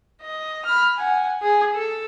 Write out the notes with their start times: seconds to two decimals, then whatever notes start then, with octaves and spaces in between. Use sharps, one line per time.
0.21 D#5
0.65 B5 F6
0.96 F#5 G#5
1.42 G#4
1.74 A4